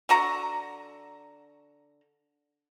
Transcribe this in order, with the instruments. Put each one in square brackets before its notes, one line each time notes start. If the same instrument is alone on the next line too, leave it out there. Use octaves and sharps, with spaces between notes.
[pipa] D3 F#4 A#5